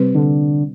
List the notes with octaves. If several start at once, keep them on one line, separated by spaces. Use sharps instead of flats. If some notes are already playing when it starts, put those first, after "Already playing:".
Already playing: C3 G3 C4 G4 B4
D3